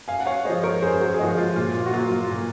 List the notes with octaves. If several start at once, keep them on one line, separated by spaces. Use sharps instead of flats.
F#2 F5 G#5
F#5
C#5 F5
F3 G#3 C5 D#5
A#4 C#5
F#2 G#4 C5
F#4 A#4
G#4
F3 G#3 D#4 F#4
F4
A#2 F4
F4
F#4
F#3 A#3 F4
F4
A#2